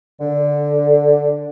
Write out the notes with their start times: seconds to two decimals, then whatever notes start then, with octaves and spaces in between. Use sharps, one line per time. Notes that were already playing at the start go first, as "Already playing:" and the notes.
0.20 D3